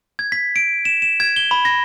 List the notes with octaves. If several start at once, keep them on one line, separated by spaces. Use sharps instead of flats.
G#6
B6
D7
E7
E7
G#6
G7
B5
A#6